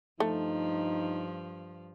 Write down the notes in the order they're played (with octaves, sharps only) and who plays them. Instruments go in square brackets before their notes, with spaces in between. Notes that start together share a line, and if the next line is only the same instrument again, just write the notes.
[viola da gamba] G2 F3 [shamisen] A3 [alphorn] D#4